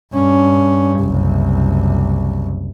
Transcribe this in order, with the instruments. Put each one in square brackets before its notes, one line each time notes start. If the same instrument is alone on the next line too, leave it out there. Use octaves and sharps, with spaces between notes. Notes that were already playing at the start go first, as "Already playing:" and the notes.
[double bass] G2 C#4
F#1 C2